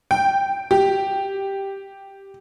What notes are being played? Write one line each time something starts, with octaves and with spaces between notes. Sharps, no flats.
G5
G4